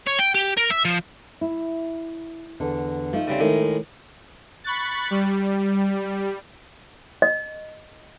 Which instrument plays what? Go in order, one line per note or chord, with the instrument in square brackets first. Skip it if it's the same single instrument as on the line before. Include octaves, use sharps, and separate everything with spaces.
[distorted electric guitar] C#5
G5
G4
A#4
E5
F3
[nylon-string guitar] E4
E2 D3
[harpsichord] F3 [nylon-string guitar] A3 D#4
[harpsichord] C#3 G3 C4
A2 D#3 G#3
[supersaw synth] B5 C#6 F#6 A6
G3
[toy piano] D#5